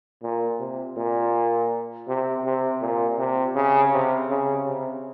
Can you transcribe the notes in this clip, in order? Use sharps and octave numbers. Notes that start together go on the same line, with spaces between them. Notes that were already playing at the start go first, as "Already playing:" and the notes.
A#2
C3
A#2
C3
C3
A#2
C3
C#3
C3
C#3
C3